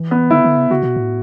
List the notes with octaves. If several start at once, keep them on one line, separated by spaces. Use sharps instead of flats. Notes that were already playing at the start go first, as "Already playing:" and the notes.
Already playing: E3
B3
D3 E4
D3
C#3
C#3 F#4
B2
A2